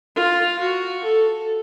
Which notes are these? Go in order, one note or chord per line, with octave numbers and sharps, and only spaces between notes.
F4
F#4
A4